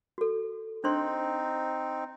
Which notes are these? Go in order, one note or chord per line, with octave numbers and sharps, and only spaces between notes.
F#4 A4
C4 D4 D#4 C5 C6